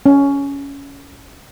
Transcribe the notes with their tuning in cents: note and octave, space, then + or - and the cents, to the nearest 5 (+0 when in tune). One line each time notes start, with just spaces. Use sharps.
C#4 +15